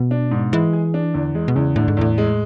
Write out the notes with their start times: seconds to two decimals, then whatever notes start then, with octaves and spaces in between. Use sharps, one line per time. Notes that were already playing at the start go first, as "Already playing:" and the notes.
Already playing: B2
0.11 D4
0.31 G#2
0.52 E3 G#3
0.73 G#4
0.94 D4
1.14 E2 D3
1.35 E3 G#3
1.48 B2
1.55 E2 C#3
1.76 A2 D3
1.88 G#2
1.97 E2 A2
2.18 G#3